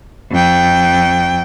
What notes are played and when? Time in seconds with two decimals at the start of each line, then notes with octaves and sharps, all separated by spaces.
0.32 F2 G5